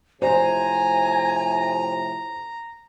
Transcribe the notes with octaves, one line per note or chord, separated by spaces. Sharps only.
A2 C3 F3 C5 G#5 A#5